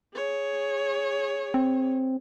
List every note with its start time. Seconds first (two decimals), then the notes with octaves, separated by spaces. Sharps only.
0.15 G#4 C#5
1.54 C4